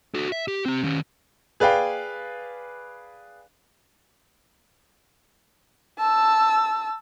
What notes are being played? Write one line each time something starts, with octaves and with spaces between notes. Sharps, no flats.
F#4 A4
E5
G4
C4 G4
D#3 C#4
G#4 B4 D5 F5 G5
A5 E6